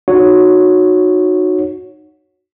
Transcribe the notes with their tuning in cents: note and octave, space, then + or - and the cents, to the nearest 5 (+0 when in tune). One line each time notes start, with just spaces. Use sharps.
D#4 -20 F#4 -15 C#5 +0